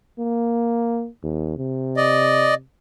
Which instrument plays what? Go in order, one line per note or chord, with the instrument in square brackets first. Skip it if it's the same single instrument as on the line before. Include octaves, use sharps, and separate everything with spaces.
[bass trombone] A#3
D#2
C3
[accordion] D5 D#5